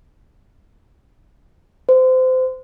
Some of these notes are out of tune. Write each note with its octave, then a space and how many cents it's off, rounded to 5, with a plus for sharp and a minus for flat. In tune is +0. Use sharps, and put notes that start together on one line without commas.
C5 -25